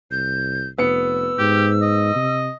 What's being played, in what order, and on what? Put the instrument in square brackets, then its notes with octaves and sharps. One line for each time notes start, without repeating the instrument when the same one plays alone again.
[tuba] C2 [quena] G6
[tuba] F1 [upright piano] B3 C#7 [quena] E6
[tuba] G#2 [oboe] G4
[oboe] D#5
[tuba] C3